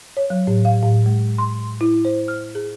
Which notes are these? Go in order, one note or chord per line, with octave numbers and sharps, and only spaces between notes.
C#5
F#3
A2
F5
A2
G#3
C6
E4
C5
F6
G#4